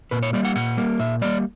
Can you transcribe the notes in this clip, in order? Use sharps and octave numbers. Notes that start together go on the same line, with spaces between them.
A#2 B4
C#5
G3 A#3 D5
F#5
A#2 F#5
G3 A#3
A#2 E5
G3 A#3 D5